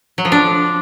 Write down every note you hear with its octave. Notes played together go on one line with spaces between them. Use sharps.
F#3
F3
D4